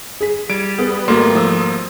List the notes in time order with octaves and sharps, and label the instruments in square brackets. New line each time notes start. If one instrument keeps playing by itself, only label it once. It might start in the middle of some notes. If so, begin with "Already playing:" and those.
[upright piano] G#4 B6
[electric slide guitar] G3 [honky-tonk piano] G#6 [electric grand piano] D7
[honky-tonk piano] B3 [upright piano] G#4
[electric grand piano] G#1 A#3 C6 [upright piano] A3 F#4
[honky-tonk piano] F3 D#6 E6